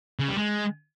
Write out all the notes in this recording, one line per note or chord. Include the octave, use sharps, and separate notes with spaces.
C#3
G3
G#3